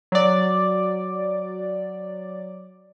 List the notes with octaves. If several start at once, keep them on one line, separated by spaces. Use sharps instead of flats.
F#3 D5